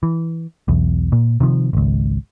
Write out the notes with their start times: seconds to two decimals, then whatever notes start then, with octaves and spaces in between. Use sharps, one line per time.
0.03 E3
0.68 B1 E2
1.12 A#2
1.40 C3 D#3 F3
1.73 G#1 C#2